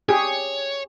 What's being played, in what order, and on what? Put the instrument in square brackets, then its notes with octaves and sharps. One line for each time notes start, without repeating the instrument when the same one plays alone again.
[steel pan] G4 G#4 [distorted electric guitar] C#5